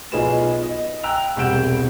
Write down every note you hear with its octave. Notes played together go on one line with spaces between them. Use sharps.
B1 D#4 F4 G#4 B4 E7
D#5
G5 A#5 E6 F#6 F7
E1 C2 F#5 G6 D7 E7